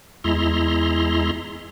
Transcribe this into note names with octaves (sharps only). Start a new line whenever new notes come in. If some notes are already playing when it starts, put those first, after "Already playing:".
E2 G#3 E4 A#5 C6